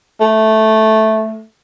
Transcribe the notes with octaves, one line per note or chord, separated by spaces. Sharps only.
A3